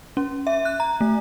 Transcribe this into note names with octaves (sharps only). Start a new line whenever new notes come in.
C#4
E5
F#6
A#5
A3